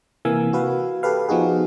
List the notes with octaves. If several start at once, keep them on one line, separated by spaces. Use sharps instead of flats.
C3 E3 A#3 F5 G#5 E6
F#4 B4 F5
G4 A4 B4 F5
F3 B3 D#4 F#4 G#4